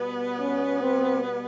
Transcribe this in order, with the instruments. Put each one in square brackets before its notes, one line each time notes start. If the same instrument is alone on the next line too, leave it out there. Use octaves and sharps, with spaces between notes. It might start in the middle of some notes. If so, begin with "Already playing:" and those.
Already playing: [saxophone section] B2 G3 B3
[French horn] C#4
C4